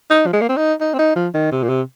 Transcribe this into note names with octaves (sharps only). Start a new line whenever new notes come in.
D#4
F3
G#3
A#3
C4
D#4
D#4
C4
D#4
F3
D#3
C3
A#2
C3